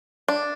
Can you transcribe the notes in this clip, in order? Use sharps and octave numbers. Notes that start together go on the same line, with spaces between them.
D4